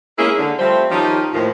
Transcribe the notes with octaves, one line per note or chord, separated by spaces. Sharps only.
G#3 A#3 C#4 E4 G#4 A#4
D3
F3 G3 A3 C4
D#3 F3 C#4 D#4 F4 G4
D#2 A2 D#3 F3